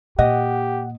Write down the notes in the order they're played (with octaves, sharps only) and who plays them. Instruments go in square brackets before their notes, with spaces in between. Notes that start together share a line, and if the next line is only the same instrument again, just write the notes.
[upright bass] A#2 [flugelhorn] G4 [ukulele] D#5 [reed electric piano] F#5